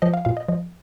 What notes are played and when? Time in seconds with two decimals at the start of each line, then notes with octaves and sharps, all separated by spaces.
0.02 F3 D#5
0.14 F5
0.25 A#2 F5
0.37 D#5
0.49 F3 D#5